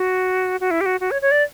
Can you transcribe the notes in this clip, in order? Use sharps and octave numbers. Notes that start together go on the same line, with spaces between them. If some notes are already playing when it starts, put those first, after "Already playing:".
Already playing: F#4
F#4
E4
G4
F#4
F#4
C#5
C#5
D5